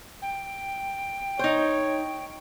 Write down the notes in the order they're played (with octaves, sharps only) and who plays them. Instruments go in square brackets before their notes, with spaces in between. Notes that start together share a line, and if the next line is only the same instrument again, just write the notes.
[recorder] G5
[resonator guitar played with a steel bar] D#4 C5 [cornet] C#5